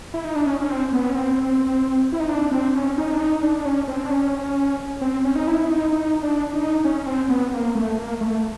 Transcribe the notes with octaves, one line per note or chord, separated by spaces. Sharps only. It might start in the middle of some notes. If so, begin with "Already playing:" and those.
E4
D#4
D4
C#4
C#4
C4
B3
C#4
C4
E4
D#4
D4
C4
C#4
D#4
D4
D#4
D4
D4
C#4
C4
D4
C#4
C4
C#4
D#4
E4
D#4
D#4
D4
D#4
C#4
C4
B3
A#3
A3
A#3
A3